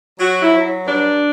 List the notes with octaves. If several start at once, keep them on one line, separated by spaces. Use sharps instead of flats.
F#3 F#4
E4
F#3
G2 D4